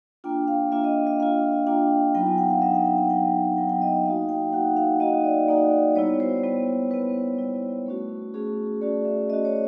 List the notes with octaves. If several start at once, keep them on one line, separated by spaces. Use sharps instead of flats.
A#3 D4 F4 G5
F5
A#3 D4 F4 E5
D#5
E5
A#3 D4 F4 F5
A#3 D4 F4 G5
F#3 B3 D#4 G5
G#5
F#5
F5
F#3 B3 D#4 E5
F#5
G5
G5
F#3 B3 D#4 G5
F#3 B3 D#4 G5
G5
D#5
D#5
A#3 D#4 F#4 F5
G5
A#3 D#4 F#4 F#5
F5
A#3 D#4 F#4 D#5
D5
A#3 D#4 F#4 D5
G3 B3 E4 C#5
C5
G3 B3 E4
G3 B3 E4 B4
G3 B3 E4
A3 C#4 F#4
A3 C#4 F#4 G#4
A3 C#4 F#4 D5
E5
A3 C#4 F#4 D#5
C#5